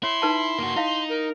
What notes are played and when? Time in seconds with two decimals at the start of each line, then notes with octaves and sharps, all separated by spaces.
0.03 E4 C#5 C6
0.22 D#4 B4 A5
0.58 A#3 F#4
0.76 D#4 E4 F5
1.09 A#4